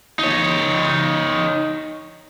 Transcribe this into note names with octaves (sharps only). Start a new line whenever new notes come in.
D#4 C#5